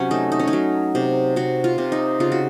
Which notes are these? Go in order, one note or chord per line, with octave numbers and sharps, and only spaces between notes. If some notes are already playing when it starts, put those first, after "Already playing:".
Already playing: C3 F#3 C#4
A3 D#4
D#4
C#4
D#4
F#3
C3
C3 F#4
F4
C3
D#4
C#3 F4
F#4